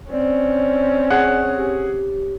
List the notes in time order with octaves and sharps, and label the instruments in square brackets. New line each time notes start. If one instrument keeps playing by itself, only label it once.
[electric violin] C4 [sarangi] C#4 [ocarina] D5
[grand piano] G#4 F#5
[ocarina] G4